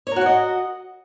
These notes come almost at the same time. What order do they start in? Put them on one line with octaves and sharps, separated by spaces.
C#5 A#4 F#4 F#5 D#5